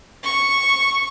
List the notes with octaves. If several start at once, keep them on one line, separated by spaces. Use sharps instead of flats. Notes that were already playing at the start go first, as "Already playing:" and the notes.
C#6